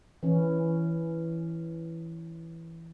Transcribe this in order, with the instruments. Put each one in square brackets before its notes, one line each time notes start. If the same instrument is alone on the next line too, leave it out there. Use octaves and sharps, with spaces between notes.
[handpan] E3 C#4